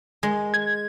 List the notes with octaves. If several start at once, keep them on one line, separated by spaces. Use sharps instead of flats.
G#3
G#6